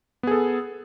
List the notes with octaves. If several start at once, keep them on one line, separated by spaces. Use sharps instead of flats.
B3 G#4 A4